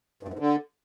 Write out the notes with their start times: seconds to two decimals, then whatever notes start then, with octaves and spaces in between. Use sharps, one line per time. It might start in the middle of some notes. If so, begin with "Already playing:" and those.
0.23 G2
0.28 F#2
0.34 G#2
0.39 D3